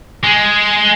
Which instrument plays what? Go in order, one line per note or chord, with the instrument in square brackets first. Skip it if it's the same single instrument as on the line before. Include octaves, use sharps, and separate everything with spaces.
[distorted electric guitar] G#3